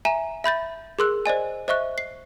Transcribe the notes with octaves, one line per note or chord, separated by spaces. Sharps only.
E5 G#5 A#5 E7
E5 B5 G6 A6
G#4 A#4 C6 E6 F#6
C5 D5 D#5 G#5
C5 D#5 E5 C#6 F#6
C7